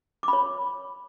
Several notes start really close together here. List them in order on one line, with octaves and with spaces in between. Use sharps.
D6 B5 C#5